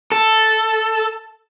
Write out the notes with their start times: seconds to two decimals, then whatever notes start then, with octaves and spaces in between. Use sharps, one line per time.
0.12 A4